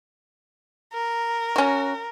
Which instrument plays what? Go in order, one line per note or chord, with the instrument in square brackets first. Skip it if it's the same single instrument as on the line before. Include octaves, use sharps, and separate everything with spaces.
[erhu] A#4
[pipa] C#4 F#4